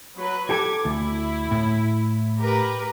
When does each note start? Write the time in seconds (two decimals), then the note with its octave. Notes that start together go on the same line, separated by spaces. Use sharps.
0.17 F#3 B4
0.50 G4 A4 D6 G#6
0.85 D2 E4
1.51 A2
2.39 G4 A#4 B4